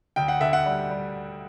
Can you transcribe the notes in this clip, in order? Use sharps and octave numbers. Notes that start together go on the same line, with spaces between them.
D2 G5
F#5
D3 E5
F#5
G3
G3